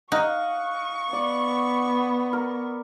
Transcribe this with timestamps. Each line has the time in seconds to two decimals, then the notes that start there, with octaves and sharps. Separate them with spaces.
0.12 D#4 D#5 F5 F#5 C#6
1.13 B3 D5
2.33 A#4